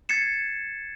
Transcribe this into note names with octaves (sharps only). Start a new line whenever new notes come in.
G#6 A6 C7 C#7 E7